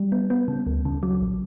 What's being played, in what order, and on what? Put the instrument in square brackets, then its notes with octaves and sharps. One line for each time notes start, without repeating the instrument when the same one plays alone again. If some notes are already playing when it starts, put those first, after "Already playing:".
Already playing: [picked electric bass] G3
[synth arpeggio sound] B3
B3
C#3
D2
C#3
F#3
A#1